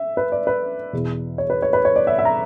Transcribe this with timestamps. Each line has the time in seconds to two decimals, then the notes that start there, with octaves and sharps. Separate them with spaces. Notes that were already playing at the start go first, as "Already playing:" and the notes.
Already playing: E5
0.17 B4
0.32 D5
0.47 B4
0.93 E2 B2
1.38 C#5
1.50 B4
1.62 C#5
1.73 B4
1.85 C#5
1.96 D5
2.07 E5
2.18 E5
2.25 A#5